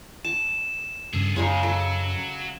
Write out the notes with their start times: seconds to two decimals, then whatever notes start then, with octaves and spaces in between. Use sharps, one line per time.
0.25 A5 E7
1.13 G2 C#3 G#4 A4
1.36 F#2 C#3 G#3 D#4 G#4 A#4
1.63 F#3 A4